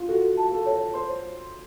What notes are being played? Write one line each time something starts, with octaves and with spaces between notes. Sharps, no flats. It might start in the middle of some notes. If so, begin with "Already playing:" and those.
Already playing: F4
F#4 A4
A5
A4
C#5
C5 C6